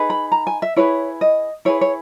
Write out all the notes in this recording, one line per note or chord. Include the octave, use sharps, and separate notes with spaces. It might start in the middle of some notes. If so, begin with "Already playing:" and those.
Already playing: D#4 G#4 B4
B5
A#5
G#5
E5
E4 G#4 B4 C#5
D#5
E4 G#4 B4 C#5
C#5